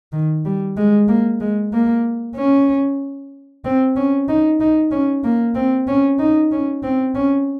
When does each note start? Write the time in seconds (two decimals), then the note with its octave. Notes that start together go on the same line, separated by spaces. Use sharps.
0.13 D#3
0.45 G3
0.77 G#3
1.08 A#3
1.40 G#3
1.73 A#3
2.36 C#4
3.65 C4
3.96 C#4
4.28 D#4
4.60 D#4
4.91 C#4
5.24 A#3
5.55 C4
5.88 C#4
6.19 D#4
6.52 C#4
6.83 C4
7.15 C#4